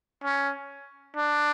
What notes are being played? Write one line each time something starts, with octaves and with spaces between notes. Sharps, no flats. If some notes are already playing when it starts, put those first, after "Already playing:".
C#4
D4